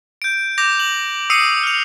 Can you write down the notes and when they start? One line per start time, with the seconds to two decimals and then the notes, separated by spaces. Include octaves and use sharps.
0.22 G6 D7
0.58 D6 G6 A#6 F7
0.80 F#7
1.30 D#6 E6 C7 C#7 D#7
1.63 F6 F7